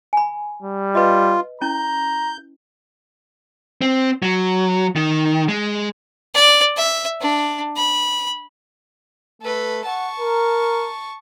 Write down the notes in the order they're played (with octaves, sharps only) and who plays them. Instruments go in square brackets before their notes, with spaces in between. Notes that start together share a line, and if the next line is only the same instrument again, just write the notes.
[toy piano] G#5 B5
[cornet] G3
[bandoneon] F4 [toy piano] B4 D#5
[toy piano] C#4 E4 [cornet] A#5 [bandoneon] G6
[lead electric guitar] C4
F#3
D#3
G#3
[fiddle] D5
E5
D4
B5
[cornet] A3 [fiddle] A4 B4
[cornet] F#5 [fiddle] A5 C#6
[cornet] A#4